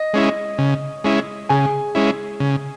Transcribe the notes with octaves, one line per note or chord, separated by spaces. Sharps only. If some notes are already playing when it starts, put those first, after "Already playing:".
Already playing: D#5
G#3 C#4 E4
C#3
G#3 C#4 E4
C#3 G#4 G#5
G#3 C#4 E4
C#3